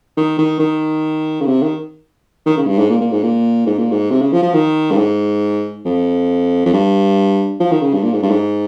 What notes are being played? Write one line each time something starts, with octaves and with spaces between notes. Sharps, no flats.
D#3
D#3
D#3
C#3
C3
D#3
D#3
C#3
G2
G#2
A#2
A#2
G#2
A#2
G#2
A#2
G#2
C3
C#3
F3
F3
D#3
G2
G#2
F2
F2
G2
F3
D#3
C#3
G2
A#2
G#2
G2
G#2